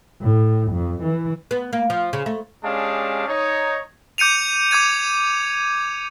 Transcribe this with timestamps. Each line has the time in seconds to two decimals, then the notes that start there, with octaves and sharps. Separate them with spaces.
0.21 A2
0.71 F2
1.02 E3
1.51 B3
1.73 A#3
1.90 F3
2.13 C#3
2.26 A3
2.64 G#3 C#4 D4 G4 F5 A5
3.28 D#4 C#5
4.18 D6 G6 C#7 D#7 F7
4.71 D6 G6 G#6 D#7